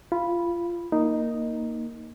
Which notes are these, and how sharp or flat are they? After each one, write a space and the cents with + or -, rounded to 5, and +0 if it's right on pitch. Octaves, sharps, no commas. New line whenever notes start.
F4 -20 B5 -5
A#3 +0 D#4 +0